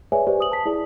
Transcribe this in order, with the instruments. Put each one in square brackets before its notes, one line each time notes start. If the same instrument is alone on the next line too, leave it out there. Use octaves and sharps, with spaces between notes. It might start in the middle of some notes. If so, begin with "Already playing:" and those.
[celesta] G#4 B4 C#5 D5 E5 G#5
G4 B4 C5 D5
D#6 F#7
A5 B6
E4 G#4 D5